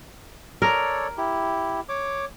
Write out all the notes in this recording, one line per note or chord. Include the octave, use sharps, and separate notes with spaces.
A4 A#4 C#5 D5
E4 G4
C#5 D6